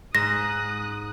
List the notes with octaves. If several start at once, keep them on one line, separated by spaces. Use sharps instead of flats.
G#2 D#6 F#6 A#6